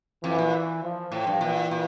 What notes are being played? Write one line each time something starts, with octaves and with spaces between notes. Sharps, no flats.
F2 E3
A#2
F3
A2 F3
G2
A#2 E3
A#2